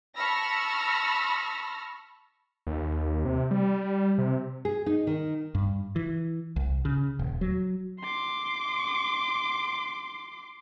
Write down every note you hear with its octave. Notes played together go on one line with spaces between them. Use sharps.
A5 B5 C#6 E6 F6 A#6
D#2
C3
G3
C3
G#4
D#4
D#3
G2
E3
C2
C#3
D#1
F#3
C6 D6